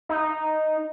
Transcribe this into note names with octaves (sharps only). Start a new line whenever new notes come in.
D#4